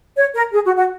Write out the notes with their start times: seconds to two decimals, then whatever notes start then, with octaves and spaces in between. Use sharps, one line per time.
0.17 C#5
0.35 A#4
0.53 G#4
0.65 F#4
0.77 F#4